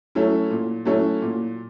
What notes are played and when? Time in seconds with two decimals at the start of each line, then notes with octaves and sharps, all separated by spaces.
0.15 F#3 A3 C#4 E4
0.51 A#2
0.85 F#3 A3 C#4 E4
1.22 A#2